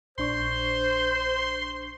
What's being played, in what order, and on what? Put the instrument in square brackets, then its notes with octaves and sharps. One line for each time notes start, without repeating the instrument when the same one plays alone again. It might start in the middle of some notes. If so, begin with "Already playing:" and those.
[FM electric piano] A#1 D4 C#6 [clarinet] C5 [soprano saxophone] C6